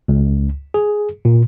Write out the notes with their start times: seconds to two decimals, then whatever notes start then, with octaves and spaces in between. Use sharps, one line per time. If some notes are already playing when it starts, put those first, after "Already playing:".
0.08 C#2
0.74 G#4
1.25 A#2